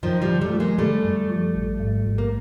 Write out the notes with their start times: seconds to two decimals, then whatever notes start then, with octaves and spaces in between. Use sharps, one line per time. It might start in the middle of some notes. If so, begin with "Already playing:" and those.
0.03 F#2 D#3 F3
0.22 F3 G3
0.28 D3
0.41 G3 A3
0.53 F3
0.60 G#3 A#3
0.78 D3 G3 A3
1.04 F#2
1.30 F3
1.55 A1
1.80 G#2
2.05 A1
2.18 A#3